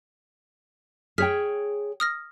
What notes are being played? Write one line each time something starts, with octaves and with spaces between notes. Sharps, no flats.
G#4 C#5 G5 F6 B6
D#6 F6 A#6